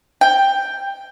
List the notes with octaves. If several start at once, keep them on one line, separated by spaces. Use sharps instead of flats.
G5